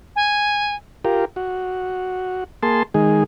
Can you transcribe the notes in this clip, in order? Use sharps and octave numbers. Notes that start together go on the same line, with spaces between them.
G#5
F4 G4 A#4
F#4
A#3 G#4 A5 C6
D#3 G#3 G#4